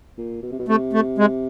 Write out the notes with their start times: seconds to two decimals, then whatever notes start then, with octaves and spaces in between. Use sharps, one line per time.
0.18 A#2
0.43 B2
0.52 C3
0.59 B2
0.68 C3 A3
0.93 A3
1.18 G#3